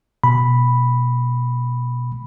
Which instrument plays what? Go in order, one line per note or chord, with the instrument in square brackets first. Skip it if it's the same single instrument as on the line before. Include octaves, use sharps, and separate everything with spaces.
[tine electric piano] B2 B5